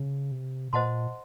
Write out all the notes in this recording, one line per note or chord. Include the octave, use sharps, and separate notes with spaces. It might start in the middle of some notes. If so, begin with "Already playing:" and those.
Already playing: C#3
C3
A#2 C5 D#5 F#5 A5 C6